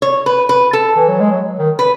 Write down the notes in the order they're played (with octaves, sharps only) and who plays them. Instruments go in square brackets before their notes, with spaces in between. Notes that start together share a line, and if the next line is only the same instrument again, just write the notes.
[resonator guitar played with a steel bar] C#5
B4
B4
A4
[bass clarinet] E3
F#3
G#3
F#3
D#3
[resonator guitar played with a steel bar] B4